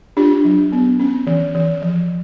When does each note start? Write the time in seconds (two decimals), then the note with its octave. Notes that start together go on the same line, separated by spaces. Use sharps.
0.17 D4 F4 G4
0.45 F#3
0.72 B3
1.00 C#4
1.27 E3
1.55 E3
1.82 F3